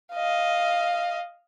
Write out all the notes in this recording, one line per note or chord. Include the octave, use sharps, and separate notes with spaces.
D#5 F5